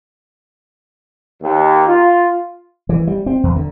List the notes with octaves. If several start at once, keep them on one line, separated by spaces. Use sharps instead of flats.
D#2
F4
E3
G3
C4
E2
D3